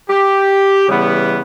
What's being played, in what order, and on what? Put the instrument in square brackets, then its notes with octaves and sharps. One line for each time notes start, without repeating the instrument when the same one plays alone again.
[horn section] G4
C#3 E3 G3 B3